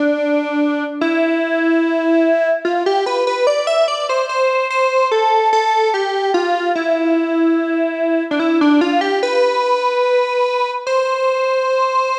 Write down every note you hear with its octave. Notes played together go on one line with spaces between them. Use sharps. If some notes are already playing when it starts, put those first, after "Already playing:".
Already playing: D4
E4
F4
G4
B4
B4
D5
E5
D5
C5
C5
C5
A4
A4
G4
F4
E4
D4
E4
D4
F4
G4
B4
C5